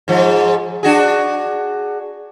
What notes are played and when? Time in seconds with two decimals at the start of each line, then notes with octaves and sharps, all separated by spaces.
0.08 G#2 F3
0.83 D4 F#4 G#4